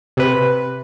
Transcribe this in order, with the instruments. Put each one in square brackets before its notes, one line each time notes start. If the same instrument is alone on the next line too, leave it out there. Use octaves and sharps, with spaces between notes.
[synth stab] C3 B4